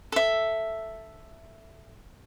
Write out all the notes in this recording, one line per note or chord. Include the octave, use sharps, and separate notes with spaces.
A4 E5